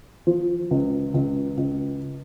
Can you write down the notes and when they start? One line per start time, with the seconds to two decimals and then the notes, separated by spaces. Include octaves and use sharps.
0.27 F3
0.71 C#2
1.14 C#2
1.57 C#2